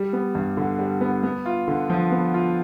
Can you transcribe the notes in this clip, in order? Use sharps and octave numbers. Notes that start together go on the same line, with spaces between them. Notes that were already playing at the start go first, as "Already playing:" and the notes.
Already playing: G3
B3
G2
D3
G3
B3
B3
F4
D3
F3
B3
F4